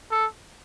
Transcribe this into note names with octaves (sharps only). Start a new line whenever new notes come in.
A4